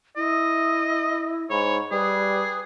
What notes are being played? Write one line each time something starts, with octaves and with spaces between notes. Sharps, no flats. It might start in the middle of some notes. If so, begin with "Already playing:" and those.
E4 D#5
G#2 C#5 B5
G3 G#4 B4